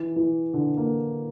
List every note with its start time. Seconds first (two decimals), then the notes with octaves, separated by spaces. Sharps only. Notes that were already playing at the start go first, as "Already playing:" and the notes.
Already playing: E3
0.16 E3
0.54 D3
0.77 A#3